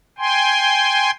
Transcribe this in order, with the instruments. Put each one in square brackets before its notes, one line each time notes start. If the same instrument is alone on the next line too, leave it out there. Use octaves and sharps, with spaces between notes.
[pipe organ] G5 G#5 C6